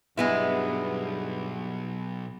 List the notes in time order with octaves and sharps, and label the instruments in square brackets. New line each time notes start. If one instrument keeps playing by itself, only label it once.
[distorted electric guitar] B1 [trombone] G2 [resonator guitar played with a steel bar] G#3 B3 E4